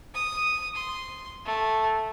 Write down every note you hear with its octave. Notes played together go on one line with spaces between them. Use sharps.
D#6
C6
A3